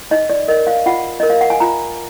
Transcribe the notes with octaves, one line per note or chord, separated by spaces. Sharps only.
D#4 D#5
D5
A#4 D#5
F5
F4 F#5
A#4 D#5
F5
F#5
G#5
F4 A#5